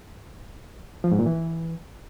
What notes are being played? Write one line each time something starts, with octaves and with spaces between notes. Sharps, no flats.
F3
G#2
A#2
E3